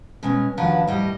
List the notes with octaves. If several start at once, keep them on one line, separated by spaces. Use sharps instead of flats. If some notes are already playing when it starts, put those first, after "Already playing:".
B2 G#3 C#4
D#2 F3 F#3 D4 B4 F#5
A2 G3 D#5